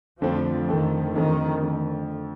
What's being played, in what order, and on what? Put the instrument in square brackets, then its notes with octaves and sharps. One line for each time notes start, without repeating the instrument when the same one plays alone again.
[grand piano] F2 D3 A3 C4 [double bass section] F3
[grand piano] F2 D3 A3 C4 [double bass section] D#3
[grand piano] F2 D3 A3 C4 [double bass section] D#3
[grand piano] D3 A3 C4